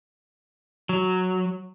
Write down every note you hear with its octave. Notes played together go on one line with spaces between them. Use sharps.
F#3